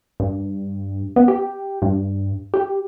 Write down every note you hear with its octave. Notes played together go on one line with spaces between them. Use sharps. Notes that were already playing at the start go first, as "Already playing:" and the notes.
G2
B3
G4
G2
G4